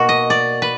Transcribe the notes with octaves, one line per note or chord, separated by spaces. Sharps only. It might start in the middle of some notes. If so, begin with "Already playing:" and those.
Already playing: B2 A#3 F#4 A#4
D#5
D5
B4